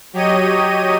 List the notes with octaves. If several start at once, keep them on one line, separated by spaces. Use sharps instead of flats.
F#3 G4 C#5 D#5 D#7